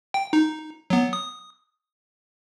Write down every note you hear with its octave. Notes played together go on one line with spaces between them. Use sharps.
G5
D#4
F#3 B3
D#6